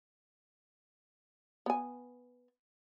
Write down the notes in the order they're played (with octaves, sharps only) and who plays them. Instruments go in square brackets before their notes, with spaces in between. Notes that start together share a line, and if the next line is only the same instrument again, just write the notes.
[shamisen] B3 G#5